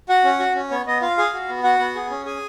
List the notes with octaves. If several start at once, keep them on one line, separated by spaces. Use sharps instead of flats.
F#4 F#5
C#4
F#4
C#4
B3 C#5
B3 D#5
F4 F5
G#4 F5
F#4
B3
F#4 F#5
B3
G#4
C#4
G#4 G#5